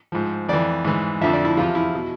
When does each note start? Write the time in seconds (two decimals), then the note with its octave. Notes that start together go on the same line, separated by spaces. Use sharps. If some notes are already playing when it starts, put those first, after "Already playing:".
0.12 G#2 F3
0.49 F2 E3 D5
0.85 G#2 E3
1.21 F2 D3 F3 E5
1.33 D5
1.45 E4
1.57 E2 C3 F3 F4
1.75 E4
1.95 B2